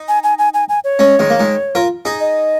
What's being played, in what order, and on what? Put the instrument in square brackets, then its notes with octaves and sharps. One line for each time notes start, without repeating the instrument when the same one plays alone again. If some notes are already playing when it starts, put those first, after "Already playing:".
Already playing: [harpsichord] D#4
[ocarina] G#5
G#5
G#5
G#5
G#5
C#5
[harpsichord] G#3 C#4
D#3 G#3
A#3
D#3 G#3
F4 A#4
D#4 G#4
[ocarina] D#5